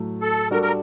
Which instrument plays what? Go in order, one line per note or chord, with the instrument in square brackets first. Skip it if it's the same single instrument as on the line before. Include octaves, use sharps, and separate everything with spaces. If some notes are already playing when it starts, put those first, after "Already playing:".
Already playing: [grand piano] A2 F#3 A3
[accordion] A4
[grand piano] G3 D4 F#4 A4 [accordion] A#4
[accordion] A#4